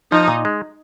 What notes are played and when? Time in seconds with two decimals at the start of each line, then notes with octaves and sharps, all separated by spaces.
0.12 F3 D#4
0.28 A#2
0.45 G#3